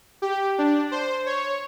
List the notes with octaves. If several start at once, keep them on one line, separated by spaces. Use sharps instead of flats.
G4
D4
C5
C#5